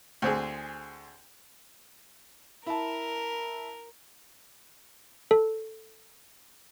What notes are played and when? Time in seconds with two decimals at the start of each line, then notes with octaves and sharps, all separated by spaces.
0.22 D2 C4 G#4
2.67 E4 A#4 A5
5.31 A4